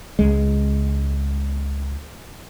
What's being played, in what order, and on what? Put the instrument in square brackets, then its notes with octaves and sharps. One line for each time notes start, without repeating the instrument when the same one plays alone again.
[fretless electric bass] C#2 G#3